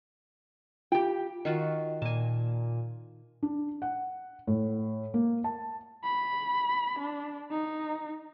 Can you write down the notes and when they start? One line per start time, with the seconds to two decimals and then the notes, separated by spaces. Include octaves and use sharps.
0.92 F4 G4 G5
1.45 D#3 F4 F#4
2.02 A#2 G#5 A5
3.43 D4
3.82 F#5
4.47 A2
5.14 A#3
5.44 A5
6.04 B5
6.99 D4
7.51 D#4